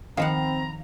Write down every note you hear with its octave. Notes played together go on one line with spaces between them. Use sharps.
D#3 F3 C4 F5 F#5 A#5 B5